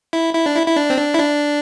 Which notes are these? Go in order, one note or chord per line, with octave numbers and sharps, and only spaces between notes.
E4
E4
D4
E4
E4
D4
C4
D4
E4
D4